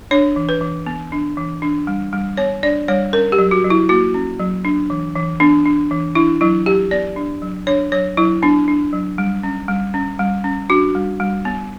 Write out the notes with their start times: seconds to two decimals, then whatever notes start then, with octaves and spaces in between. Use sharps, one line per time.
0.11 D4 C#5
0.36 E3
0.49 B4
0.61 E3
0.86 B3
1.12 D4
1.37 E3
1.62 D4
1.87 G3
2.13 G3
2.37 B3 C#5
2.63 D4 D5
2.88 G3 C#5
3.13 C#4 A#4
3.32 G4
3.38 F#3
3.51 F#4
3.64 F#3
3.70 E4
3.89 A#3 F#4
4.14 C#4
4.39 F#3
4.65 D4
4.90 E3
5.15 E3
5.40 B3 D4
5.66 D4
5.91 E3
6.15 D4 E4
6.41 F#3 E4
6.66 F#3 G4
6.91 B3 D5
7.16 D4
7.42 F#3
7.67 D4 C#5
7.92 F#3 C#5
8.17 F#3 E4
8.42 B3 D4
8.68 D4
8.93 F#3
9.18 G3
9.43 C#4
9.68 G3
9.94 C#4
10.19 G3
10.44 C#4
10.70 D4 F#4
10.95 G3
11.20 G3
11.45 B3